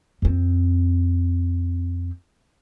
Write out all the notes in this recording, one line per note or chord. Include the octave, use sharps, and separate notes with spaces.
F2 C4